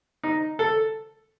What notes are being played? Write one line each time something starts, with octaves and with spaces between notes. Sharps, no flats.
D#4
A4